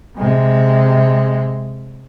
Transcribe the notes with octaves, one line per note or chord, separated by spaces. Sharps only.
C3 G#3